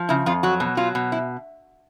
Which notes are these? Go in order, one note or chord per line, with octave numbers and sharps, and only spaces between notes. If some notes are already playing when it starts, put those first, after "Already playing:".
Already playing: F3
C#3 E4
F2 F4
F#3 F#4
B2
F#3 F4
B2
E4